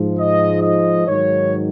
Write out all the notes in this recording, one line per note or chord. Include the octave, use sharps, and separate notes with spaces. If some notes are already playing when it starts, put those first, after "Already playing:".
Already playing: G#2 F3
D#5
D#5
G#2 D#3 F#3 C#5